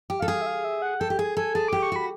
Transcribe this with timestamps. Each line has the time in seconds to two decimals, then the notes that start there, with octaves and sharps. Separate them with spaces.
0.10 G4
0.19 A4 F5
0.28 G#4
0.42 E5
0.46 F5
0.64 E5
0.82 F#5
1.00 A4 G5
1.10 G4
1.19 G#4 G#5
1.37 A4 G#5
1.55 G#4 A5
1.68 G4 D6
1.82 C#6
1.92 F#4 B5